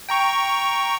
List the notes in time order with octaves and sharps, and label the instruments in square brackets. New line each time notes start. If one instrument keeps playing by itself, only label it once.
[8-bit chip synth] G5 A#5 C#6